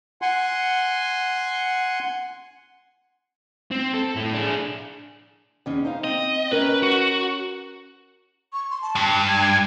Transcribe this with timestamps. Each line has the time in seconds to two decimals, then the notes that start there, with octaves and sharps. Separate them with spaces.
0.22 F#5 G#5 C6
3.71 C4
3.94 A4
4.16 A2 A3
4.33 D4 G#4
5.66 E2 C#4 D#4
5.85 D#4 C5 F5
6.04 C4 D#5
6.52 C#4 A#4 B4
6.83 F#4
8.53 C#6
8.70 C6
8.82 A5
8.95 G2
9.29 G#6